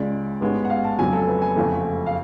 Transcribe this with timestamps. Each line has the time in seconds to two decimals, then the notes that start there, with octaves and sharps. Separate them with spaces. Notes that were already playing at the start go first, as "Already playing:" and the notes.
Already playing: C#2 C#3 G#3 D5
0.41 A1 G#2 G#3 B3
0.65 F#5
0.70 F5
0.84 A5
0.99 F1 F2 C#3 F#3 G#5
1.13 A4
1.27 B4
1.42 G#5
1.56 F#1 F2 C#3 F3 A3
2.06 F5